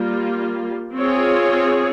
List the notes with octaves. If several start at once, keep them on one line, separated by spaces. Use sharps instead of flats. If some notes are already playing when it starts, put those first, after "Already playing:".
Already playing: G3 A#3 F4
C4 F4 G#4 C#5